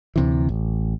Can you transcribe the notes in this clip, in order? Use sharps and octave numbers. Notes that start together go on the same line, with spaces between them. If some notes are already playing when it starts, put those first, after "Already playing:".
D2 C3 E3
A1